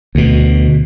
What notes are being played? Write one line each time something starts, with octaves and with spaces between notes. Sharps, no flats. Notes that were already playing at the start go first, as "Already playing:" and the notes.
D2 B2